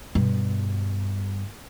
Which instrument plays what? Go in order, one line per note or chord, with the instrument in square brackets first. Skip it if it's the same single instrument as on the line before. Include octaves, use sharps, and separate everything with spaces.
[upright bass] G2 B2